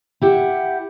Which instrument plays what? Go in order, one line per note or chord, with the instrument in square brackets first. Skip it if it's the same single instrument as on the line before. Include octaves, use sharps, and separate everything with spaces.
[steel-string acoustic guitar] E4 G4 F#5